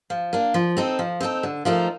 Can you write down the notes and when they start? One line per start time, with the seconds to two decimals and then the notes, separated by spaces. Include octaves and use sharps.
0.10 F3
0.33 A#3 D4
0.54 F3
0.77 C4 D#4 A4
0.99 F3
1.21 C4 D#4 A4
1.43 D3
1.65 F3 A3 D#4 A#4